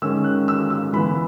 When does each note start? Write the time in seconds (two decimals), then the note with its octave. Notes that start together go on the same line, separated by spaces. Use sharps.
0.02 D#3 G#3 C#4 E6
0.24 F#6
0.48 E6
0.70 E6
0.93 E3 B3 E4 B5